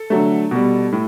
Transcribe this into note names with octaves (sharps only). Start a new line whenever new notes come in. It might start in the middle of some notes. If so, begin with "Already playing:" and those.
Already playing: A4
D3 F#3 A3
B2 G3
A2